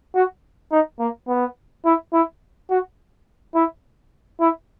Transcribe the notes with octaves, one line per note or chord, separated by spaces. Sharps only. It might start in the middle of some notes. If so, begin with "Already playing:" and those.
F#4
D#4
A#3
B3
E4
E4
F#4
E4
E4